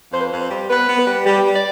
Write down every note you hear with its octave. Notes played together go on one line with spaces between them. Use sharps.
F2 C5
B4
F2 C5
C5
G3
B3 B4
B3
B4
G3
G3
G3
D5